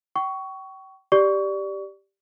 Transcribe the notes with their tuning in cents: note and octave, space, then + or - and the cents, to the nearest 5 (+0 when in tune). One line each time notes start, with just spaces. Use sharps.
G5 -35 C#6 +15
G4 +0 D5 +0 C#6 +30